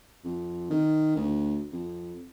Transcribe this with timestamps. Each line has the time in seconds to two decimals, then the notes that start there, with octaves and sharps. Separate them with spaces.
0.24 F2
0.70 D#3
1.16 D2
1.72 F2